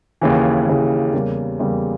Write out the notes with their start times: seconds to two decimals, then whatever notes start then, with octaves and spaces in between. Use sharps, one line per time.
0.21 D#2 C#3 E3
0.67 D#2 C#3 E3
1.13 E2 C#3 G3 A#3
1.59 E2 C#3 G3 A#3